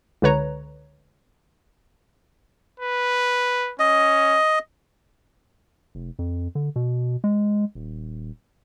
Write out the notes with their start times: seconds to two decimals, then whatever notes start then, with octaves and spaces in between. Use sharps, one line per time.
0.22 C#2 D3 B4 C#5 A#5
2.80 B4
3.79 C#4 D#5
5.95 F1
6.19 F2
6.55 D3
6.76 B2
7.24 G#3
7.75 D#1